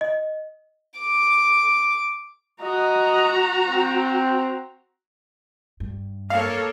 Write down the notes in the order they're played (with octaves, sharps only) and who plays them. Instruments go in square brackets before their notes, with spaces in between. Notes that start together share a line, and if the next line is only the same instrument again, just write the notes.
[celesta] D#5
[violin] D6
[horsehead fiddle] F#4 A#5 [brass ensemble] D#5
[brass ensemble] C4
[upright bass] G2
[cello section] A#3 A4 C#5 [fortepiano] F5 [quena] F6